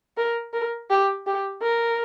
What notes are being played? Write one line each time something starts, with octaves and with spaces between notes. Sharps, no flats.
A#4
A#4
G4
G4
A#4